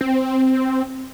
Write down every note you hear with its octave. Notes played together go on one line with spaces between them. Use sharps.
C4